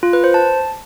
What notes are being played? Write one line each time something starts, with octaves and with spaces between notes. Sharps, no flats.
F4
B4
C5
A5